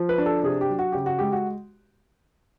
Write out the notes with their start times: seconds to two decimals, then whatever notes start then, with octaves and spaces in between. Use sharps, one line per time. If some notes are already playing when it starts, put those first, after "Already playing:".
Already playing: F3
0.09 B4
0.18 D4
0.26 A4
0.43 C3 G#4
0.61 G4
0.70 F#3
0.79 F#4
0.92 C#3 G4
1.06 F#4
1.19 G#3 G4
1.32 F#4